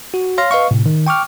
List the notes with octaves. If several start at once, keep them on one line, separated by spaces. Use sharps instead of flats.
F#4
C#5 F5 C6 F6 A#6
B4 D#5 F5 C#6
A2 C3
D#3
G5 C#6 D6 F6